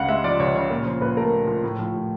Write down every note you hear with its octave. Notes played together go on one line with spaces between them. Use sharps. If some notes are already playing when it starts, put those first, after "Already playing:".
Already playing: C#2 C#3 F5 F#5
G#3 E5
F3 D5
C#2 C#5
C#3 C#5
A#2
C#5
F3 C5
A#2 B4
A3 A#4
A#2
F3
A2
F3
A2